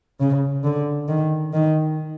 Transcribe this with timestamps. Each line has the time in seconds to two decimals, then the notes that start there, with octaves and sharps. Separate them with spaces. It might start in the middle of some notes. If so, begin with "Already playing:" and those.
0.20 C#3
0.64 D3
1.08 D#3
1.53 D#3